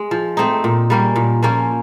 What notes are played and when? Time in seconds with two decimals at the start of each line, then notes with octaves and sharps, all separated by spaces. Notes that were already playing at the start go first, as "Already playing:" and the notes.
Already playing: G#3
0.11 F3
0.37 A3 C4 D#4
0.64 A#2
0.90 G3 A#3 C#4
1.16 A#2
1.43 F3 A#3 C#4